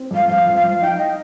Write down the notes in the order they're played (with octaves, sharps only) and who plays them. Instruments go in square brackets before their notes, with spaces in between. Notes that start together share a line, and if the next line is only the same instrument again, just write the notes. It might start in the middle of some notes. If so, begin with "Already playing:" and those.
Already playing: [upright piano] C4
[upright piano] F2 [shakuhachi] F5
[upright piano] F3 [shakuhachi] F5
[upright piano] F3
[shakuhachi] F5
[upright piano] F3
[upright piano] D#4 [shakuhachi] G5
[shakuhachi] D#5